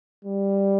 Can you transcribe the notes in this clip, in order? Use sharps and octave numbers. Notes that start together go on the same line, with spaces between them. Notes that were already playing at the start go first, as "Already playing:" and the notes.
G3